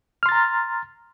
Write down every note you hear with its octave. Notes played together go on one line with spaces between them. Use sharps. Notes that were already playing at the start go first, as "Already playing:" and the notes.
A#5 C6 F6 A6